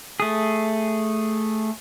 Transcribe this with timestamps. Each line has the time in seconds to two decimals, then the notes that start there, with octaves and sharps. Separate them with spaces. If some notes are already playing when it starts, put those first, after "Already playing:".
0.20 A3 G#4